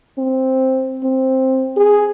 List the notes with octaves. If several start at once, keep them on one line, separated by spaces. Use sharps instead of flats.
C4
C4
G#4